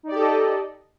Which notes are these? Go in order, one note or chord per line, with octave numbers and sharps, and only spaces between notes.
D#4 G4 A4 D5 D#5